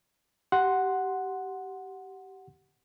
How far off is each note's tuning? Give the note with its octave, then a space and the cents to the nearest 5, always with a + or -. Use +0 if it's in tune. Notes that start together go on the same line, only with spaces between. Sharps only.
G4 -20 F#5 +0 C6 +0